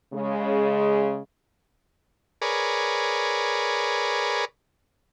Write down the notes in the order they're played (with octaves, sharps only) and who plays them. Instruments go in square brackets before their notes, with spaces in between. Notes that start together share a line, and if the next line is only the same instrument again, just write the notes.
[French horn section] C#3 G#3
[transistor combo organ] G#4 A#4 B4 C#5 D5